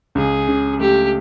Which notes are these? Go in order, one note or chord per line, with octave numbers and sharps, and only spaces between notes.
C#2 G#4
C#3
A3 G4